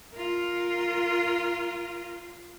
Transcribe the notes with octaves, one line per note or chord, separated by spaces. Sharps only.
F4 A#4